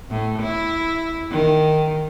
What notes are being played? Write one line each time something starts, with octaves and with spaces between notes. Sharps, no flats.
A2
E4
D#3